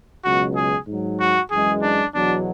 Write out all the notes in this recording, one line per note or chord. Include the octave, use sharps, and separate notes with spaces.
C#2 B2 F#3 F#4
G#4
G#2 F#3
F#4
F#2 E3 G#3 G#4
D4
E2 B2 F#3 D4